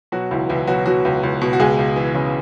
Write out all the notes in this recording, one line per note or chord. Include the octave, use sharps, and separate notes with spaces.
B2 F#3 F#4
C#2 E3 E4
C#2 E3 E4
B2 F#3 F#4
B2 F#3 F#4
C#2
C#2
B2
F#4
C#2 G#3 G#4
C#2
E3
C#3